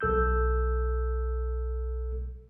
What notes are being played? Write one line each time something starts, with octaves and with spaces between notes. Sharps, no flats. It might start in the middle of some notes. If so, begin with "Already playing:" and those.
B1 A4 E6 G6